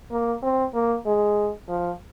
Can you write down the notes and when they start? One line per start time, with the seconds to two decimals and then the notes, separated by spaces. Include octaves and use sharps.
0.11 A#3
0.43 C4
0.74 A#3
1.06 G#3
1.69 F3